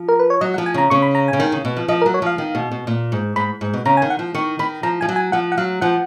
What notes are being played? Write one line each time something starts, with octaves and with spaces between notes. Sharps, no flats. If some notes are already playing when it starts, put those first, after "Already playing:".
Already playing: F3
A#4
B4
C#5
F#3 D#5
F#5
F3
G#5
C#3 A#5
C#3 C#6
B5
A#5
C#3 G#5
D#3
C#3
B2
F3
F3 D#5
A#4
F#3
C#5
F3 F5
D#3
B2
B2
A#2
G#2
G#2 B5
G#2
B2
C#3 A#5
G#5
D#3
F#5
F3
D#3 C#6
D#3 B5
F3 A#5
F3 G#5
F#3
G#5
F3 F#5
F#5
F#3 F5
F3 F#5